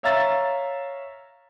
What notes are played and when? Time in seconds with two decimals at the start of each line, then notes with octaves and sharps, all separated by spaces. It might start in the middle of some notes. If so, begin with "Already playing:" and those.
0.03 C#5 E5 F5 A#5 E6 A6